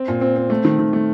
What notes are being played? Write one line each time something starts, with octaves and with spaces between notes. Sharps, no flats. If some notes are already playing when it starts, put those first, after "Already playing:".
Already playing: C4
A#2
C4
C4
A3
D#3
D#3
A3